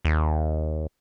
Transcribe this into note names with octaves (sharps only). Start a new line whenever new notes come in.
D#2